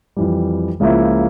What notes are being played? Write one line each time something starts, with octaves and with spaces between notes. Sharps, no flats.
F2 E3 G3
C#2 C#3 F3 A#3 E4